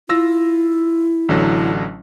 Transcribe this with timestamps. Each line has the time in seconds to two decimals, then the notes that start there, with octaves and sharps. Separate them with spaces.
0.09 E4 F4 E6 A#6
1.29 A1 D3 F#3